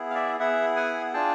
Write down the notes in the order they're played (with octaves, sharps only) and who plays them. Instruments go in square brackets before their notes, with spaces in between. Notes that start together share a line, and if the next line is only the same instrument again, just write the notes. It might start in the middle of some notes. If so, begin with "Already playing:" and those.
Already playing: [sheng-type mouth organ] B3 E4 G#4
F5
D5 E5
B3 E4 G#4 E5 F#5
F#5 G#5
D4 F4 G#4 G5 A5